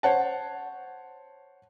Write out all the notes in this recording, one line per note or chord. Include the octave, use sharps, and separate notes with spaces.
C5 C#5 F#5 A5